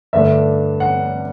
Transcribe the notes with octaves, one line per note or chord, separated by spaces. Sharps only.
G2 D3 A3 D4 E5
F#5